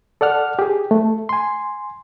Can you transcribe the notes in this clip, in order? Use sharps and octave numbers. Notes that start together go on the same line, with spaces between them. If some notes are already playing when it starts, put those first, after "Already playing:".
A4 D5 F#5 F6
G4 G#4
A3
G#5 C6